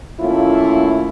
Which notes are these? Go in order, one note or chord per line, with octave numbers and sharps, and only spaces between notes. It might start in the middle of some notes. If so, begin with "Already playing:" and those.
D#3 A3 A#3 C#4 E4 F4